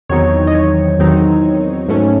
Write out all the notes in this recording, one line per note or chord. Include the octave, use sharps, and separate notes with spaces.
E2 D#3 F#3 C4 D#4 C#5
D#5
C#5
E2 D#3 F#3 C4 D#4
G#2 F#3 A3 C#4